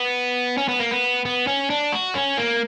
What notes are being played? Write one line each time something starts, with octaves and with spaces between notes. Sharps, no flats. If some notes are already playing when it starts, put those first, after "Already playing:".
Already playing: B3
C#4
B3
A#3
B3
B3
C#4
D4
F#4
C#4
A#3